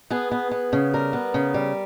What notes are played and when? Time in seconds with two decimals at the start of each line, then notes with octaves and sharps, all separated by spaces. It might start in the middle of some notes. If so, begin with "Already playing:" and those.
0.10 B3 G#4
0.31 B3
0.51 B3
0.73 C#3
0.94 G3 A#4
1.13 B3
1.34 C#3
1.54 G3